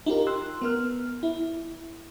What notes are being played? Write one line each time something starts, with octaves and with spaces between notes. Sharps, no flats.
D#4 F4 G4 A#4
C6 E6 F#6
B3 A#4 F6
E4